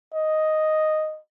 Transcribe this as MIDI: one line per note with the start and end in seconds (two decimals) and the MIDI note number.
0.14 1.19 75